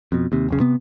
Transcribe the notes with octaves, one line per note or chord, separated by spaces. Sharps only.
F2 B2
D#2 C3
E1 B1 C#3
C3 B3